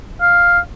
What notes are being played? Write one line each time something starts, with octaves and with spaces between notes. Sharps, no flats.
F5